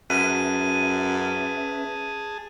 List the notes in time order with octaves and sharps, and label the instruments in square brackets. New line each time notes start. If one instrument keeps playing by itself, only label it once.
[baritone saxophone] F#2 [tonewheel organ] C#4 B4 E5 [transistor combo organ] G#4 A5 [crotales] D#7